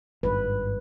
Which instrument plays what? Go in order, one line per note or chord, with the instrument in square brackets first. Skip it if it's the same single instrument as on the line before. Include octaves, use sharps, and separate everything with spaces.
[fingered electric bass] G#1 G2 [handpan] B4